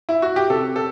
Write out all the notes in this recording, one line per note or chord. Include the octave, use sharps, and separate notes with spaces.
E4
F#4
G4
C3 A4
A4